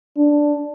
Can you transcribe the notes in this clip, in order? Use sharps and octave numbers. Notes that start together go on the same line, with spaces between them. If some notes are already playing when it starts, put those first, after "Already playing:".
D4